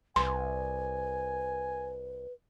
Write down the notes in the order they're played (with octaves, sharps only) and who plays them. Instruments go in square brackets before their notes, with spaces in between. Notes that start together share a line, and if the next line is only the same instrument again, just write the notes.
[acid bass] C2 [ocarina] B4 [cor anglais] G#5 [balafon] C6